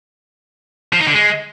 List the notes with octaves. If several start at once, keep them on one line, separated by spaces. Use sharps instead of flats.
F3
D#4
D3
G#3